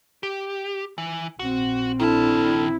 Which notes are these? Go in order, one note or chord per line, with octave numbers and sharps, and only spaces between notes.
G4
E3
A#1 C4 F#4
D#3 D4 E4 A4 A5 F6